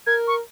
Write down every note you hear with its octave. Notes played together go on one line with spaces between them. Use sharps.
A#4 G#6
C#6